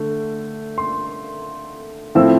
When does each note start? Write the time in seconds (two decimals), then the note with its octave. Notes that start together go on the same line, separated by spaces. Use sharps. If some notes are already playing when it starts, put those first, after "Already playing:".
Already playing: D3 A3
0.78 C6
2.15 A2 F3 C4 E4 E6